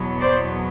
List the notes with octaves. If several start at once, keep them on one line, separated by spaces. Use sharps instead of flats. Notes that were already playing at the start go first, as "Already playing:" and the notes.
Already playing: E2 B2 F#3 B3
C5 D5